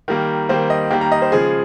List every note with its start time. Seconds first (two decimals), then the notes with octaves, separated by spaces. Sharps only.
0.08 D#3 G3 A#3 A#4
0.49 D#3 G3 A#3 C5
0.70 D#5
0.91 D#3 G3 A#3 G5
1.01 A#5
1.12 D#5
1.22 C5
1.32 C#3 F3 G#3 G#4